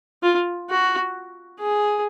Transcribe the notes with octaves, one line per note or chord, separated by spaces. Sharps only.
F4
F#4
G#4